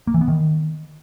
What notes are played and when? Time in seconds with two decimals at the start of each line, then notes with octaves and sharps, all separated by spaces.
0.07 A#3
0.14 E3
0.21 B3
0.28 D#3